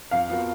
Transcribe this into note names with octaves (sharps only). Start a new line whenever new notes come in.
F2 F5
F3 B3 F#4 A#4